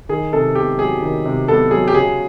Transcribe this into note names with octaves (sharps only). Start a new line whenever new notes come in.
D#3 G#4
C3 A4
B3 G4
F#3 G#4
D#3
C3
B3 A4
F#3 G#4
G4
C#3 G#4